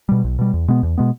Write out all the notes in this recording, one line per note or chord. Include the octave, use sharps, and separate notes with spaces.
B2 G3
B1
B2 G3
E2
B2 G#3 B3
E2
B2 G#3 B3